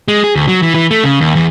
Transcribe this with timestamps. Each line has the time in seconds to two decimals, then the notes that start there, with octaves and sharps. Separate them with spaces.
0.08 G#3
0.24 G#4
0.36 D2
0.48 F#3
0.62 E3
0.75 E3
0.91 A3
1.04 C#3
1.21 D#2
1.35 E2